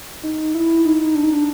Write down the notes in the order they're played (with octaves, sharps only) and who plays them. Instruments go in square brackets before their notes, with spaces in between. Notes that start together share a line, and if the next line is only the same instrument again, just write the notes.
[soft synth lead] D#4
E4
D#4
D4
D#4
D4